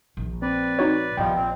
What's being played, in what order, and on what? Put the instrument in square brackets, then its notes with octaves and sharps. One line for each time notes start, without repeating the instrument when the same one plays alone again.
[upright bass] A#1
[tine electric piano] C4 [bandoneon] B4 D5
[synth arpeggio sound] D#4 F#4 C#5
[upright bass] A#1 [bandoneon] F3 G3 B3 [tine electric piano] D#5 G5
[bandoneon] A#2 C4